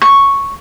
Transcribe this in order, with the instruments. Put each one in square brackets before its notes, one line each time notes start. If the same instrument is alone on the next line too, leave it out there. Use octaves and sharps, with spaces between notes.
[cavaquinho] C#6